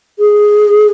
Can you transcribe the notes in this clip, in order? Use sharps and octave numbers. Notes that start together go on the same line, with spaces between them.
G#4